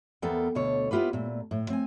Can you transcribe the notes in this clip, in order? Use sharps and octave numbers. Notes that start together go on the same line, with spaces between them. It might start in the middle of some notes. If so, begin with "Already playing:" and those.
E2 E3 B3 A4 A#4 G5
D2 B2 D3 A4 C#5
B3 E4 F4 G4 B4
A#2 A3
A2
C4 G#5